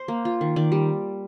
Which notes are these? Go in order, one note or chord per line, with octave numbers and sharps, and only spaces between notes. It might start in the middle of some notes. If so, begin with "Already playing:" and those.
Already playing: C5
A#3
F4
D#3
D#3 D5
G3